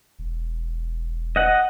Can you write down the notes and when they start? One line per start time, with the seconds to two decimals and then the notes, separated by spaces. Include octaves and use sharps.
0.19 E1
1.36 D#5 F#5